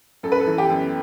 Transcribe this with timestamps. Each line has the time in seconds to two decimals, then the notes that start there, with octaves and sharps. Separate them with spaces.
0.23 F#2 A4
0.32 B4
0.40 A4
0.47 E3
0.58 G4
0.70 F#2